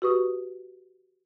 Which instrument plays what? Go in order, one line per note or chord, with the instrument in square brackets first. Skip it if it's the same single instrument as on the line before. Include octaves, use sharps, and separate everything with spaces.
[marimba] F#4 G4 B4 C#6 D#6